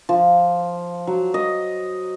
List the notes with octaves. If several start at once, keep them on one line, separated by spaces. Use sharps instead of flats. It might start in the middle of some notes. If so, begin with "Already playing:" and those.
F3
F#3
D#5